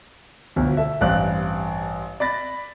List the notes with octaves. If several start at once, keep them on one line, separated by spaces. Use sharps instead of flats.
G1 D2 B2
A4 E5
A1 G2 C4 D5 F5 F#6
D5 B5 A6 A#6